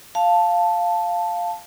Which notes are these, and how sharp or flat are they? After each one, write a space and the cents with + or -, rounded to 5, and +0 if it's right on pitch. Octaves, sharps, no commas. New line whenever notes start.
F5 +0 A5 +0